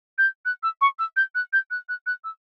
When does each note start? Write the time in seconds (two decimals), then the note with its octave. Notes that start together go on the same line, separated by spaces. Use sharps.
0.18 G6
0.45 F#6
0.63 E6
0.81 C#6
0.99 E6
1.16 G6
1.35 F#6
1.53 G6
1.71 F#6
1.89 F#6
2.06 F#6
2.24 E6